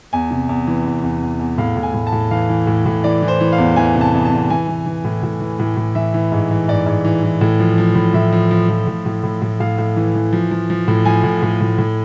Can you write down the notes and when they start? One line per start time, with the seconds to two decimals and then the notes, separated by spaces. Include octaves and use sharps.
0.13 E2 G#5
0.31 C3
0.49 E2
0.67 E3
0.86 E2
1.03 E2
1.22 E2
1.40 E2
1.58 A2 F5
1.77 A2
1.83 G#5
1.94 A2
2.07 A5
2.12 A2
2.31 E3 F5
2.49 E3
2.67 A2
2.86 A2
3.04 E3 D5
3.22 E3
3.28 C5
3.40 E3
3.53 F5
3.58 E2
3.76 E3 G#5
3.95 C3
4.01 A5
4.14 E2
4.26 A5
4.32 E2
4.50 E3 G#5
4.68 E3
4.86 E3
5.05 A2
5.23 A2
5.40 E3
5.59 A2
5.77 A2
5.95 E3 E5
6.14 E3
6.32 G#2
6.51 E3
6.68 G#2 D5
6.86 G#2
7.04 E3
7.23 E3
7.41 A2
7.60 F3
7.78 F3
7.95 A2
8.14 A2 E5
8.33 F3
8.51 F3
8.70 F3
8.87 A2
9.06 A2
9.24 A2
9.42 A2
9.60 A2 F5
9.78 A2
9.96 E3
10.15 E3
10.33 F3
10.51 F3
10.70 F3
10.88 A2
11.05 F3 G#5
11.24 A2
11.43 A2
11.61 A2
11.79 A2